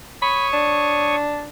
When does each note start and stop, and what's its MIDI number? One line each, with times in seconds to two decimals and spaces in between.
0.22 1.16 73
0.22 0.47 83
0.22 1.16 85
0.22 1.16 87
0.53 1.48 62